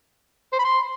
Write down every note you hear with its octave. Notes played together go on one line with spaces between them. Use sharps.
C5
B5
C6